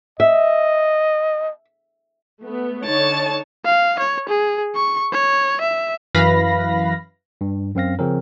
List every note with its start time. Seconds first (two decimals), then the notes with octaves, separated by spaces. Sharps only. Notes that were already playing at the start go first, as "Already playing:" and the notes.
0.20 D#5 E5
2.42 A3 B3
2.86 D3 D#4 C#5 A5
3.65 F5
3.99 C#5
4.29 G#4
4.76 C#6
5.13 C#5
5.61 E5
6.15 F#2 E3 B4 F5 B5 A#6
7.41 G2
7.75 F#2 C4 F5 A#6
7.99 C#3 F3 C4 C#4 A#4